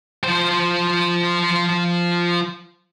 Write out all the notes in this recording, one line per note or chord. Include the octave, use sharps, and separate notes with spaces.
F3 C5